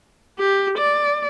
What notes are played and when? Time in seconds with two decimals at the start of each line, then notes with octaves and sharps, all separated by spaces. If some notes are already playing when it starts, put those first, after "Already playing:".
0.38 G4
0.78 D5